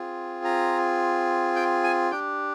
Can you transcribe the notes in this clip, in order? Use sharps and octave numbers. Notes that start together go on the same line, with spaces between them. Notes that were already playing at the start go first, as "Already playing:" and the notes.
Already playing: C4 F4 G#4
A#5
G5
G#5
D4 G4 G5